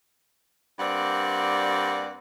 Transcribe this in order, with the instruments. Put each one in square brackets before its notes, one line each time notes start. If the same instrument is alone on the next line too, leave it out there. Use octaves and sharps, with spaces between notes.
[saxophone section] G2 A#3 C4 D5 F#5